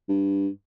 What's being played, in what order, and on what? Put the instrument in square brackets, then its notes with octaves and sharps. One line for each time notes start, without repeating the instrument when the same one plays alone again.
[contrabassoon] G2